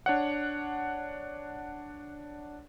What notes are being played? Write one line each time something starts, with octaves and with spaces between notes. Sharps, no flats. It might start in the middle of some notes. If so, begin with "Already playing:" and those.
D4 C#5 F#5